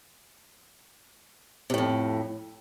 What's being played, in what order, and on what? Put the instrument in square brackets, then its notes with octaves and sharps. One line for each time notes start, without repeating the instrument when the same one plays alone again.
[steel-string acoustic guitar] C3
A2
F2